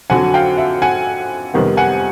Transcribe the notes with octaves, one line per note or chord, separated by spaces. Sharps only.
F2 D3 F#3 F#5 G#5
F5 G5
E5 F#5
F#5 G#5
F2 C3 D#3 G3 B3
F#5 G#5